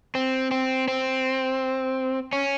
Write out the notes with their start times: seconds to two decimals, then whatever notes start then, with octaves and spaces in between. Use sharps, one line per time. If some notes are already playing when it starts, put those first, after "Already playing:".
0.15 C4
0.51 C4
0.88 C4
2.33 C#4